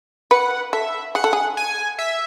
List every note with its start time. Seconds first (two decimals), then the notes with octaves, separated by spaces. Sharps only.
0.31 B4 F#5
0.73 A4 E5
1.15 G#4 F#5
1.24 A4
1.33 G#4
1.57 G#5
1.99 E5